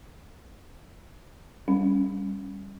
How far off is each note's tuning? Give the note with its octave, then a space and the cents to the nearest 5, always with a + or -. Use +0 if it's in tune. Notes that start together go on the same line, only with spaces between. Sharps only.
G3 +5 C#4 +0